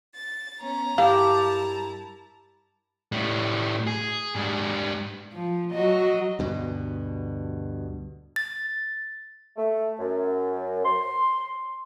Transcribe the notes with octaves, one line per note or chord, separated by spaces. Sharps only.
A6
B3 C#4 A#5
G2 E4 G4 A#4 F5 A5
A2 G3
G#4
G#2 G3
F3
F#3 F#4 D#5
D2 G2 B2
A6
A3
F#2
C6